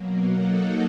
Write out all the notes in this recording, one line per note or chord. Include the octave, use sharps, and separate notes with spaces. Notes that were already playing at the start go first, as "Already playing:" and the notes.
Already playing: B2 F#3 A#3
F#3 A#3 D#4 F#4 A4